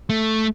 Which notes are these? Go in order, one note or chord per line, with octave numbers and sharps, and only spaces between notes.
A3